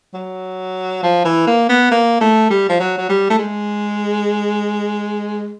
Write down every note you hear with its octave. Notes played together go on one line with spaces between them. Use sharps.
F#3
F3
E3
A#3
B3
A#3
A3
G3
F3
F#3
F#3
G3
A3
G#3